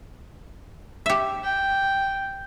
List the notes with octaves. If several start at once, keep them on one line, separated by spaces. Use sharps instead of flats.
G4 E5
G5